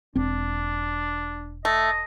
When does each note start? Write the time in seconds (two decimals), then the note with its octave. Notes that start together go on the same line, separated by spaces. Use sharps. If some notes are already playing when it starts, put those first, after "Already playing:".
0.15 E1 C4 D4
1.65 A3 D#5